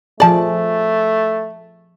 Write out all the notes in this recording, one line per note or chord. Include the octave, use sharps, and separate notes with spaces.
F3 A3 G#4 D5 A5